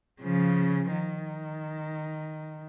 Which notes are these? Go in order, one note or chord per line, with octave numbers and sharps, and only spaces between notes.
C#3 F3
D#3